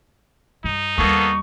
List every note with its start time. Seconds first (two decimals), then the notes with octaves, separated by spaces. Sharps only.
0.64 G2 D#4
0.98 D#2 G3 A#3 B3 A4 C#6